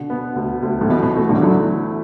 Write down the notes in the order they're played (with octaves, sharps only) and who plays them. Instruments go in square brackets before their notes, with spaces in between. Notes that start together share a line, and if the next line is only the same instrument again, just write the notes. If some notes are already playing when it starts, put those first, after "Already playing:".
Already playing: [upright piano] B2 D3
B3
D2
D2
[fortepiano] A2
[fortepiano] B2 [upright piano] E3
[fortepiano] B2
[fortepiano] B2 [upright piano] A3
[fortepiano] A2 D3
[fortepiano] D3 F#3 [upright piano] E4